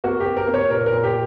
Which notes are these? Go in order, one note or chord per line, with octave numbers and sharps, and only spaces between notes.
A#3 F#4
A#3 G4
A#4
A#3
C#5
A#2 A#4
A#4
A#2
G4